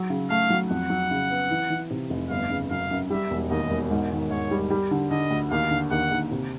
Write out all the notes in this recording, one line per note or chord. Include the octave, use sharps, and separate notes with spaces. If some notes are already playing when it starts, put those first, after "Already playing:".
Already playing: F#3
C#3
A3 F5
F#3
F2 F#5
F#3
C#3
B3
E3
E3
C3
F1
G1 F5
C#3
F#2 F5
F#2
G3 E5
E1
D#2 D#5
E1
G#2
D#3
G#2 C#5
G3
G3
D3
D3 D#5
D2
D#2 F5
D3
D#2 F#5
D#2
C3